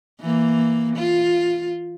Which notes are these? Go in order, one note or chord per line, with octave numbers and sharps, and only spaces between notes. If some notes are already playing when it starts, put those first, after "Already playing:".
E3 A#3
F4